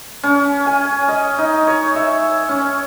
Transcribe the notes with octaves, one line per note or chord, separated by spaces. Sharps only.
C#4
G#5
D#5
D#4
C#5
E5
C#4